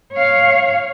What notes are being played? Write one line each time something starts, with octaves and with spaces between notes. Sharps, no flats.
C#5 F5